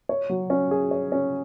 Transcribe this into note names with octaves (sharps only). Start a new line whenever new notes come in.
C#5
F#3
C#4
G#4
C#5
C#4